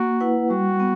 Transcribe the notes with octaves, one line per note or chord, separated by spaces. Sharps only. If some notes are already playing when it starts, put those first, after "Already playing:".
Already playing: A#3 F#4
E4 B4 F#5
G3 F#4
B3